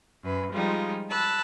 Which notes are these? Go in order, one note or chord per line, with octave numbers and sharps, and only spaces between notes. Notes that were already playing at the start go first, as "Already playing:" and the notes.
F#2 B4
F3 G3 G#3 D#4 F4
A5 B5 E6 F#6